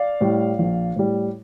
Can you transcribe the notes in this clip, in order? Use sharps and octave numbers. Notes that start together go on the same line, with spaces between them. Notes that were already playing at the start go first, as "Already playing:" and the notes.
Already playing: D5 F5
A2 G3
A#1
A2 G3